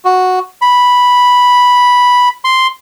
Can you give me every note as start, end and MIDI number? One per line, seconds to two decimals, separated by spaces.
0.05 0.39 66
0.62 2.29 83
2.45 2.67 84